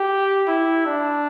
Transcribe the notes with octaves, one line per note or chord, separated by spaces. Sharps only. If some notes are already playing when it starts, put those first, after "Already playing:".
Already playing: G4
E4
D4